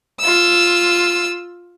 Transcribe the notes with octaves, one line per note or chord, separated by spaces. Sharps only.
F4 E6